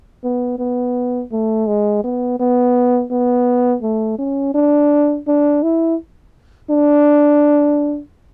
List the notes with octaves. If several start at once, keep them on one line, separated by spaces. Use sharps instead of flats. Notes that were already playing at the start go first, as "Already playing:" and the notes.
B3
B3
A3
G#3
B3
B3
B3
A3
C#4
D4
D4
E4
D4